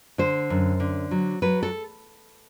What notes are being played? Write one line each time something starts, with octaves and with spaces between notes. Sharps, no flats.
D3 C5
F#2
D3
F#3
F#3 B4
A4